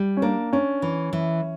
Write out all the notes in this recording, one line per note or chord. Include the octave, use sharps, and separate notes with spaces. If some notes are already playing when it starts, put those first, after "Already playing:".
Already playing: G3
C#4
A#3 D4
C#4 D4
E3
E3